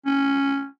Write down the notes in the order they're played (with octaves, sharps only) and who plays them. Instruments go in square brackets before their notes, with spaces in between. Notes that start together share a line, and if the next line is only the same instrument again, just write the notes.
[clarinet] C#4